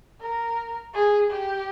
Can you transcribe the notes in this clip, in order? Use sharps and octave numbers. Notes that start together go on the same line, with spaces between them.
A#4
G#4
G4